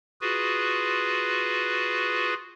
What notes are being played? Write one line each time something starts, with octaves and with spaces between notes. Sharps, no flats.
F4 F#4 G#4 B4